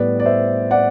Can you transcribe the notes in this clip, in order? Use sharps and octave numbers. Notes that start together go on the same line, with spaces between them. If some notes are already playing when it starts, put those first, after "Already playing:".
Already playing: A2 G3 B3 B4 D5
D5
C5 E5
D5 F#5